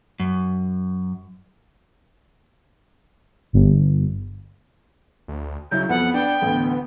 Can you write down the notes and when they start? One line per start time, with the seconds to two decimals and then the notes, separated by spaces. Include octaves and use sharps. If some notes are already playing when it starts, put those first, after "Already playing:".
0.20 F#2
3.53 G1
5.28 D2
5.71 C#3 F#3 E4 G6
5.89 F2 B3 F#5
6.14 D4 G5
6.42 A1 D2